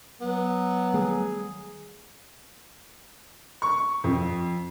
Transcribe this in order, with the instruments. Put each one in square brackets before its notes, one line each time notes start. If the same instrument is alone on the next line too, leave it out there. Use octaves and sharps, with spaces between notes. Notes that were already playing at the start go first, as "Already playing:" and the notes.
[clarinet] F#3 [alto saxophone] B3
[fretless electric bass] D#3 G3 A3 [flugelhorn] G#4
[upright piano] C#6
F2